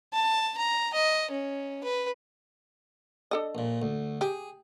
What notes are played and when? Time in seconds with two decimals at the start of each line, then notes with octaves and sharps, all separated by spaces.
0.13 A5
0.57 A#5
0.94 D#5
1.31 C#4
1.84 B4
3.31 D4 A4 D#5
3.55 A#1 A#2
3.82 D2
4.21 G4 G#4